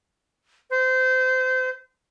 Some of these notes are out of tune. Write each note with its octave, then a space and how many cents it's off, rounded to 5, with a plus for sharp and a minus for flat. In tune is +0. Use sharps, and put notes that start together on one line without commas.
C5 -25